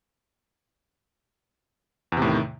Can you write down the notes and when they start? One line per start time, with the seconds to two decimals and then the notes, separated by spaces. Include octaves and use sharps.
2.12 E2
2.17 C3
2.22 A2
2.27 D#3